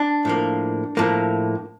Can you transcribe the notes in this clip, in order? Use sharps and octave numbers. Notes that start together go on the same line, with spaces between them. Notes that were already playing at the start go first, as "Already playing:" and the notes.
Already playing: D4
A2 F3 A#3
A2 F3 A#3